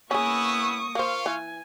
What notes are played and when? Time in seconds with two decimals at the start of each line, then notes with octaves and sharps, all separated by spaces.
0.11 A#3 B3 C#4 E4 G#4 C#6 D#6
0.95 A#3 F4 C5 F5 C#6
1.26 E3 G#5